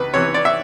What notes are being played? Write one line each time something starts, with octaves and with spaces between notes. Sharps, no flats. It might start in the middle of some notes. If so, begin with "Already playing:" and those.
Already playing: C#2 B4
C3 E3 C#5
D5
E5